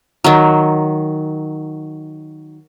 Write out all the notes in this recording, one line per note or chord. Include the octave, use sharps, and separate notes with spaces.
D#3 F#3